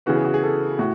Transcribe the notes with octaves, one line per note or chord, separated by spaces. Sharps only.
C#3 E3 B3 F#4
G#4
F#4
G#4
A4
A2 F#4